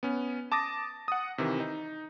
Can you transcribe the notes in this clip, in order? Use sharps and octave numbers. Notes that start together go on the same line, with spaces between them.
B3 C#4
A5 D6 D#6 A6 A#6
F#5 D#6
C3 D#3 E3
D#4